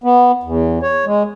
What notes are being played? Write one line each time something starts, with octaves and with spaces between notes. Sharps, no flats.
B3
E2
C#5
G#3